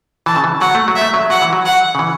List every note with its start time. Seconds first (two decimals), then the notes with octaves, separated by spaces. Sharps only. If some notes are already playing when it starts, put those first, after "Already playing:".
0.26 E3 A5
0.36 C#3
0.44 E3
0.61 F#3 F#5
0.75 A3
0.88 F#3
0.96 E5
1.01 A3
1.14 F#3
1.30 F#3 F#5
1.42 E3
1.53 F#3
1.66 F#5
1.95 C#3
1.99 E3